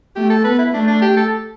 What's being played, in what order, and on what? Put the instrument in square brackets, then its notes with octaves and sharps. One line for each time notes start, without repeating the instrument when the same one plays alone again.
[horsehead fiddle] A3 [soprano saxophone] G4
[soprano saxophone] A4
[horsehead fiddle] B3 [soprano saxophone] B4
[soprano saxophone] E4
[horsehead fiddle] A3 [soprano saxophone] D4
[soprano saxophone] D4
G4
A4